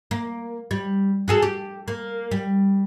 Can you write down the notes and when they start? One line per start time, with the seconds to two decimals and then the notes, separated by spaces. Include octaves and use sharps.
0.11 A#3
0.71 G3
1.28 F#4 G#4 A4
1.42 G4
1.88 A#3
2.31 G3